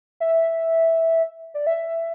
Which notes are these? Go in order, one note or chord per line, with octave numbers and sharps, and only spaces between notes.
E5
D5
E5